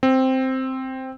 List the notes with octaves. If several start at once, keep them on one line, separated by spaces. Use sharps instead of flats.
C4